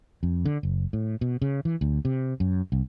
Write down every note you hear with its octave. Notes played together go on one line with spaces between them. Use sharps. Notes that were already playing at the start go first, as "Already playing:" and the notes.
F2
D3
F#1
A2
B2
C#3
E3
D2
C3
F#2
C2